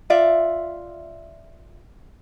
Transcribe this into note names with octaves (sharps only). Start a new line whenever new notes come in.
F4 D5 E5